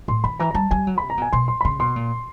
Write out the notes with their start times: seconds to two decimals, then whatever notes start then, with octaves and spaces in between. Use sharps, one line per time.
0.08 A2 C6
0.24 D#3 B5
0.40 E3 A#5
0.51 A#5
0.54 G3 A5
0.71 G3 G#5
0.87 F#3
0.98 C3 B5
1.10 A#5
1.17 B2 G#5
1.33 B2 C6
1.48 C6
1.61 B5
1.65 C#3 C6
1.79 B2 C6
1.96 A#2